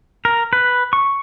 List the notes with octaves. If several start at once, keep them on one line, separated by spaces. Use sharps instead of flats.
A#4
B4
C#6